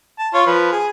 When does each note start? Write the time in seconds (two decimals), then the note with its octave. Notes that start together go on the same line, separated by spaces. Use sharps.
0.19 A5
0.34 F4 C#5
0.47 F3 B4
0.72 G#4